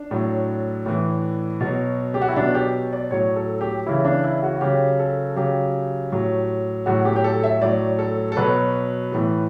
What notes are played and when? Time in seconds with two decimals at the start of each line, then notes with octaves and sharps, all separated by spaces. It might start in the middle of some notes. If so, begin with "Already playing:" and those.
Already playing: D4
0.11 A2 F#3
0.86 A2 E3
1.61 B2 F#3
2.14 G4
2.21 F#4
2.28 E4
2.36 B2 F#3 D4
2.54 G4
2.93 D5
3.11 A2 F#3 C#5
3.36 A4
3.61 G4
3.86 C#3 E3 E4
4.05 D4
4.24 E4
4.43 F#4
4.61 C#3 F#3 G4
4.99 A4
5.36 C#3 F#3 G4
6.12 A2 F#3
6.86 A2 F#3 F#4
7.05 G4
7.16 G4
7.24 A4
7.44 E5
7.62 A2 F#3 D5
7.99 A4
8.32 A4
8.37 B2 F#3 B4
9.12 A2 E3